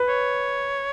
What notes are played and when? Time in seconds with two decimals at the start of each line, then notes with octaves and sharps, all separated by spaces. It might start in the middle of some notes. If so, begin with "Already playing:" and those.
Already playing: B4
0.09 C#5